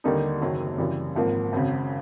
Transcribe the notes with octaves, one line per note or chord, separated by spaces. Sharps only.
D#2 D3 G3 A#3 D#4
F#1 F#2 D#3 F#3
F#2 C#3 E3 G3
G#1 G#2 F3 A#3
G#1 F#2 C#3